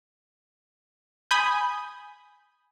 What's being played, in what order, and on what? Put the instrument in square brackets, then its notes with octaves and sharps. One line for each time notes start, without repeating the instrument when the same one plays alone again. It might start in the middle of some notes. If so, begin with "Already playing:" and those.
[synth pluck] G#5 B5 D#6 G6